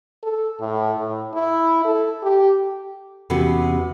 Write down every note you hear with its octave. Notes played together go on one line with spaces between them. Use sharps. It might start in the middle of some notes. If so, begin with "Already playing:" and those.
A4
A2
A2
E4
A4
G4
E2 C3 B3 C#4 F#4 B4